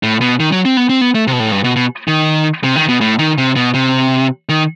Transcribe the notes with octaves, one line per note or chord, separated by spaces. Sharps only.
A2
B2
D#3
F#3
C4
B3
C4
B3
A3
C3
B2
A2
G2
B2
B2
D#3
C3
D#3
B2
A2
D#3
C3
B2
C3
D#3